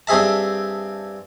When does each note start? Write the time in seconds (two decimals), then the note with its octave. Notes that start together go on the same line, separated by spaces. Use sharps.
0.07 G2 C4 G#4 E5 A5